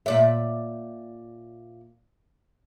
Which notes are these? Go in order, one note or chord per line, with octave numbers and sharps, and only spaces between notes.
A#2 D5 E5